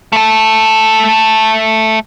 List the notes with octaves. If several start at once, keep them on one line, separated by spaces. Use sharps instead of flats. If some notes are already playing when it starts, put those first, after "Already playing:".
A3 A4